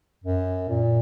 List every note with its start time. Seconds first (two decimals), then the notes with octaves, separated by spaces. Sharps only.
0.24 F#2
0.69 A#2